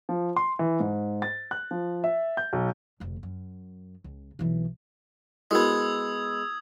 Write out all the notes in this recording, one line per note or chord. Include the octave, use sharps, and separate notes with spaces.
F3
C6
E3
G#2
A6
F#6
F3
E5
G6
B1
F1 D2
F#2
C#2
B1 E3
G#3 B3 E4 F#4 A#4 D#6 E6 G#6